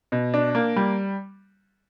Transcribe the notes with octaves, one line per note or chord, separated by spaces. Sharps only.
B2
D4
A#3
G3